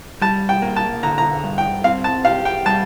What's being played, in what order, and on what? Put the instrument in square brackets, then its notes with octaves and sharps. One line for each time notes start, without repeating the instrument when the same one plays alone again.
[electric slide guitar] G3 [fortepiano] A5
[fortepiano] G5
[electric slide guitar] A#3
[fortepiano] A5
[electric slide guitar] D3 [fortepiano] A#5
[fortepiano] A#5
[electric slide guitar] G2
[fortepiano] G5
[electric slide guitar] C4 [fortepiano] F5
[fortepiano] A5
[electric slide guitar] G4 [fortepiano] F5
[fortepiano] G5
[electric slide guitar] G3 [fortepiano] A5